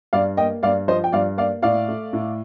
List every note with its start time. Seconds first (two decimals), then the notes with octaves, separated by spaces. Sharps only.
0.13 G2 D5 F5
0.37 A#3 D#5 G5
0.63 G2 D5 F5
0.88 F3 C5 D#5
1.04 G5
1.12 G2 D5 F5
1.37 A#3 D5 F5
1.62 A2 D5 F5
1.88 A3
2.13 A2